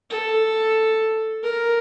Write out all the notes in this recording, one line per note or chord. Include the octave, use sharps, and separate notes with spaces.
A4
A#4